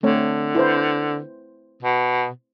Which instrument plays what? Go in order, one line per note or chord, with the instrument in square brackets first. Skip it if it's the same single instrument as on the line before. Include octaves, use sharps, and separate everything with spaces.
[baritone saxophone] D3 [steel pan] A3 C4 C#5
[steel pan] E4 B4 C5
[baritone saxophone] B2